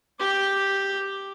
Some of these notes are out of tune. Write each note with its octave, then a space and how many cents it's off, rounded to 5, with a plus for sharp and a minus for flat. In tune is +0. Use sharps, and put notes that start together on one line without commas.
G4 +0 D6 +0